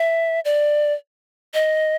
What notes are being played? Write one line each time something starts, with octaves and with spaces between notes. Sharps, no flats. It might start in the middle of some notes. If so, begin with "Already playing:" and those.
Already playing: E5
D5
D#5